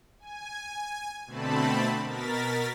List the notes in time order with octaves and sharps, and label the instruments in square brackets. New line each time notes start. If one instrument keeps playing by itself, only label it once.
[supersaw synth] G#5
B2 D3 A3 C4 A5 B5
B2 A#4 A6 B6